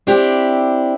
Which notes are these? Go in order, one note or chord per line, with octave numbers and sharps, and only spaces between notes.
C4 D4 E4 G4